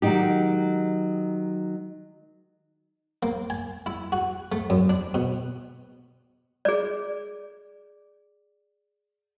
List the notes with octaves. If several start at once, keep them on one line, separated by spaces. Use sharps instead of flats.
D#3 F#3 G#3 D#4 G4
A#3
G#5
E4
F#4
A3
F#2
D4
B2
G#4 D5